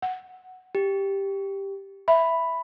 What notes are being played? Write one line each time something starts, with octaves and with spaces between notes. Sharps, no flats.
F#5
G4
E5 B5